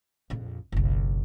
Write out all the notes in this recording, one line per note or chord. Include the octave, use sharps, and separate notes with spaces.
A#1 F2
F#1 B1